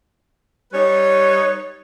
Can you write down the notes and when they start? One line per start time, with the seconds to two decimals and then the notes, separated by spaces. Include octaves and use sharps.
0.72 G3 D#4 B4 C#5